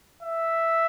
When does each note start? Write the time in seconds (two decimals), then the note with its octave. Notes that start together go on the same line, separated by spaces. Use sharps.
0.23 E5